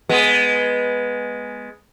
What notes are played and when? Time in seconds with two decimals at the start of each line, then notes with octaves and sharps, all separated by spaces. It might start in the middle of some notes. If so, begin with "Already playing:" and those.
0.09 G#3 B3